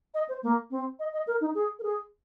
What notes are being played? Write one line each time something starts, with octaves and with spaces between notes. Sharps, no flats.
D#5
C5
A#3
C4
D#5
D#5
A#4
D#4
G#4
A#4
G#4